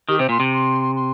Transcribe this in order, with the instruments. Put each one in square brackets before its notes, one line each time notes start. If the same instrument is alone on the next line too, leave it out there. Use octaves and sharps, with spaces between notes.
[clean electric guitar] D#3 [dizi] G4
[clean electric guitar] C3 [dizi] C5
[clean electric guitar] A#2 [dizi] C6
[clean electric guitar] C3
[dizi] C6
C6